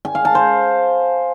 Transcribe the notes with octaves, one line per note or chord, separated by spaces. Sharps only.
G#5
F5
A5
C5